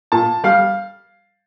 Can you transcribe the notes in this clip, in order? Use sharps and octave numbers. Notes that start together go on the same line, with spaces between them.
A#2 A5
G3 F5